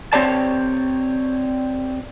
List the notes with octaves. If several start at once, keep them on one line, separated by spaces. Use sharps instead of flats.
C4 G4 C#5 D5 A5